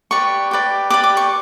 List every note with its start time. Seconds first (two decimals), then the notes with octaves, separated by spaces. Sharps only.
0.11 G4 B4 D5 C#6
0.51 G4 B4 D5
0.90 G4 B4 D5 D6
1.04 D6
1.17 C#6